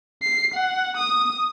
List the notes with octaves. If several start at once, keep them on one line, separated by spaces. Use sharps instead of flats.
C7
F#5
D#6